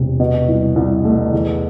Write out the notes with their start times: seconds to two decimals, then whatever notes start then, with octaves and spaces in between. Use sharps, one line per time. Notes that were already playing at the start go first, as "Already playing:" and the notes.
Already playing: E1 C3
0.20 B2
0.48 C2
0.76 C2
1.05 A3
1.32 E2